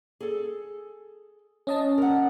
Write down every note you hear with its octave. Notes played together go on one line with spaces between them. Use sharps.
G#4 A4
C#4 D#5 A5
A#4 F#5